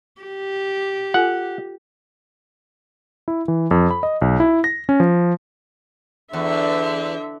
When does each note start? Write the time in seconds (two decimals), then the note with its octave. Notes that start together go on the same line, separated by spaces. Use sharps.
0.21 G4
1.14 F4 A4 F#5 G#5
3.28 E4
3.48 E3
3.71 F2
3.91 B5
4.03 D#5
4.22 B1
4.40 E4
4.64 A#6
4.89 C#4
5.00 F3
6.33 E2 D3 E5